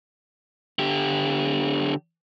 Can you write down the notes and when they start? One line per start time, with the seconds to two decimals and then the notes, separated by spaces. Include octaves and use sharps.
0.79 D3 G4